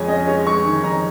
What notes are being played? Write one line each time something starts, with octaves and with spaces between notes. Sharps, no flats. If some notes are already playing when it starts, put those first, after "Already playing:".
Already playing: F2 G#3 C#5 G#5
C#4 D#5
G#3 C#5
G#3 C#6
D#3
F2 A#5